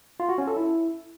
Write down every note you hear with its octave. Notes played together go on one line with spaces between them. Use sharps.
F4
F#4
C#4
A4
E4